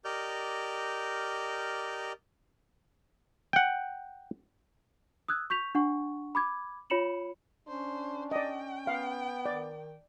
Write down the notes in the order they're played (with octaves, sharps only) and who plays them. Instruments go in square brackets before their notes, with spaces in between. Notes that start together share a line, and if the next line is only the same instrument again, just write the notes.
[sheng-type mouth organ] G4 A#4 D5 D#5 F6 G6
[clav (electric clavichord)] F#5 G5
[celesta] D#6 E6 F#6 G#6
C#6 G6 B6 F7
D4 F#5 C#6
B5 D6 G#6
F4 C#5 B5 C#7 E7 F#7
[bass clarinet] C#4 [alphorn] D4 [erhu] C5
[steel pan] D5 D#5 [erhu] G5
[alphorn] B3 [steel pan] F5
[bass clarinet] D#3 [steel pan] D5